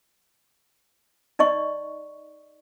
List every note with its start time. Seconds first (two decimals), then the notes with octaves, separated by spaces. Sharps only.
1.39 D#4 D5 D#5 C#6